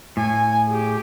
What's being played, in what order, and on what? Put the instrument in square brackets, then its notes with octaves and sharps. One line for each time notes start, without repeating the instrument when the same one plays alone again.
[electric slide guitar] A2 [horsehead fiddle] G#5
[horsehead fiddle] G4 G#4